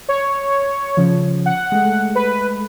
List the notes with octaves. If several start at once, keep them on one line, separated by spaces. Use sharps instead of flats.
C#5
C#3 F3
F#5
G#3 A3
B4